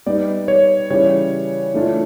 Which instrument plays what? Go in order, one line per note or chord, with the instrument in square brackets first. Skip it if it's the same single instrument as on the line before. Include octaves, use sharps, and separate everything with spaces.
[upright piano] G3 B3 D#4 [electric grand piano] D5
[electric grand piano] C#5
[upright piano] C#3 E3 G3 [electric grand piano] C#5
[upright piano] E3 A3 D4 F4